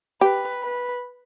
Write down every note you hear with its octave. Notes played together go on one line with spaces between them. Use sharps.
G4 B4
B4